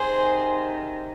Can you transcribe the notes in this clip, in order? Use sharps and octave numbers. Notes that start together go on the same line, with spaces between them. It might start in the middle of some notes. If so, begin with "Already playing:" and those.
Already playing: C3 D#3 G#4 C5